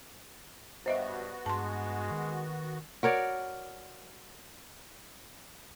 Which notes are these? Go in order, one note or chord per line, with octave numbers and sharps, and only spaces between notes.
G2 B3 F#4 C5 D#5 E5
G2 G#3 A5 C6
D#3
F#4 A#4 C#5 D5